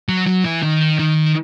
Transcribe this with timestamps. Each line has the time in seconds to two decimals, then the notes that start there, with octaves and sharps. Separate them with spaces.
0.09 F#3
0.27 F#3
0.46 E3
0.63 D#3
0.99 D#3